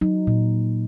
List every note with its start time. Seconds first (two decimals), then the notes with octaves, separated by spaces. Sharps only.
0.01 F#3 D#4
0.27 A#2